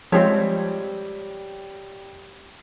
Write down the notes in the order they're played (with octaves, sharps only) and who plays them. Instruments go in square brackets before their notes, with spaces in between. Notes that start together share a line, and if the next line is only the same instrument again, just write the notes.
[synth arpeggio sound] F3 G#3 C4 [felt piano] G3 G5 B6 [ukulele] C#5